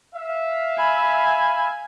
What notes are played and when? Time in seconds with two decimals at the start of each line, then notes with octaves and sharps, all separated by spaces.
0.14 E5 F5
0.78 G#5 B5